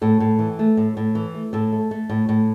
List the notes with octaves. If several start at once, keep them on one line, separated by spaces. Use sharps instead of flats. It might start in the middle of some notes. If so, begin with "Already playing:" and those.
A2 A4
A2
E3
A3
A2
A2
E3
A3
A2 A4
A3
A3
A2
A2